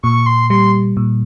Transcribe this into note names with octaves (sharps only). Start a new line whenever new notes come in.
A#2 C#6
C6
G3 C6
A#2